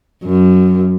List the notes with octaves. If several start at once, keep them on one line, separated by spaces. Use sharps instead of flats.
F#2